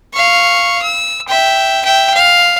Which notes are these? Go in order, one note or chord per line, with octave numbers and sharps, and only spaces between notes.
F5 C#6
E6
E5 G5
E5 G5
F5